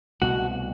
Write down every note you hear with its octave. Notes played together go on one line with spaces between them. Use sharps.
C2 B2 A3 F#4